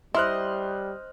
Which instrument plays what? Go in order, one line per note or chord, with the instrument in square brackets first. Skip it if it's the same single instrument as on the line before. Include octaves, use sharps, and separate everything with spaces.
[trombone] G3 [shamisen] E4 [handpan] C5 D#5 [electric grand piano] C6 F6 F#6